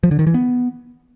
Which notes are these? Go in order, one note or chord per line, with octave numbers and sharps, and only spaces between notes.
F3
D3
D#3
E3
B3